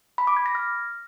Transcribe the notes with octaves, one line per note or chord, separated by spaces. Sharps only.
B5
D6
G#6
A#6
F6